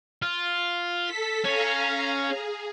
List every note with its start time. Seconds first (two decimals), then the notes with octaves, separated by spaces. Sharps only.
0.22 F4
1.04 A4 B6
1.44 C#4 F5 A#5
2.26 G#4